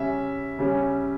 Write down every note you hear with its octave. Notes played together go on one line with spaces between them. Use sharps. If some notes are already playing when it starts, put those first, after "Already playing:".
Already playing: C#3 G3 C#4 E5
C#3 G3 C#4